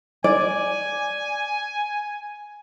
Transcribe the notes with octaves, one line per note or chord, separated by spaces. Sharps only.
D5 G#5